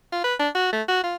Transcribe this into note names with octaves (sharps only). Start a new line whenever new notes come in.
F4
B4
D4
F#4
A3
F#4
F4